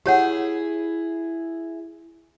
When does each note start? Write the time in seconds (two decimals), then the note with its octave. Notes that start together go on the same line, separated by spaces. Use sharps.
0.06 E4 G4 G#4 C#5 F#5